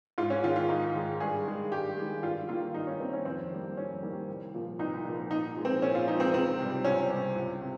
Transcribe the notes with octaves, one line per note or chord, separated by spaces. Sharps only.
G#2 F4
C#4
D#3 G#3 F4
F4
G#2 D#4
D#3 G#3
G2 G#4
D#3 G#3
G2 G4
D#3 G#3
G2 F4
D#3 A#3 F4
G2 D#4
C#4
D#3 A#3 C4
C#4
F2 C4
D#3 G3 A#3
F2 C#4
D#3 G3 A#3
C2
A#2 F3
C2 D#4
A#2 F3
A#2 D#4
F3 G#3
C4
A#2 C#4
F4
F3 G#3 D#4
C4
C#2 C4
C3 G3
C#2 C#4
C3 G3
C#2
C3